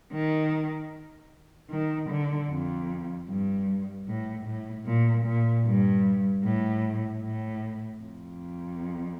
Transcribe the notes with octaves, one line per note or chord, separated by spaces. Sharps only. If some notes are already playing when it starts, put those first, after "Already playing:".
D#3
D#3
D3
F2
G2
A2
A2
A#2
A#2
G2
A2
A2
F2